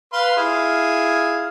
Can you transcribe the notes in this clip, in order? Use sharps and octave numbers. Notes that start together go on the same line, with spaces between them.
B4 F5 C6
E4 F4 G#4